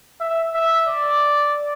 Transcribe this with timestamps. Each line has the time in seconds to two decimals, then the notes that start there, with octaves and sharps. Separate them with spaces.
0.21 E5
0.54 E5
0.88 D5